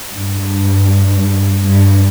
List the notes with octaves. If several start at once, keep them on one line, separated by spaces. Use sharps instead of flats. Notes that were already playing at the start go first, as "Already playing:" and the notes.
G2
G2